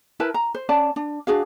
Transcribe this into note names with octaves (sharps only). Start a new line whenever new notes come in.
E4 A#4 B4 A5
A#5
C5
C#4 D5 A5
D4
D4 F#4 G#4 F5